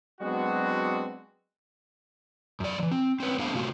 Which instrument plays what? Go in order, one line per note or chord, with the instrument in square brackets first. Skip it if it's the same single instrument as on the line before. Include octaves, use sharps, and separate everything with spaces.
[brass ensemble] F#3 G#3 B3 C4 D4 F#4
[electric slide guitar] F#2 D5
E3 F3
C4
C4 C#4 B4
A3 B3 C4 D4 F5
C3 A3 F4 F#4